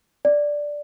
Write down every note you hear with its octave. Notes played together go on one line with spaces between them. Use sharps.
D5